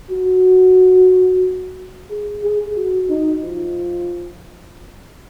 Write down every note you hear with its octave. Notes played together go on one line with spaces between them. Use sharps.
F#4
G#4
G#4
F#4
D#4
F3